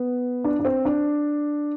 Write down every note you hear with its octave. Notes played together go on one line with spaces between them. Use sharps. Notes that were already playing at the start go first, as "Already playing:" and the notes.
Already playing: B3 B4
D4
D4
C4
D4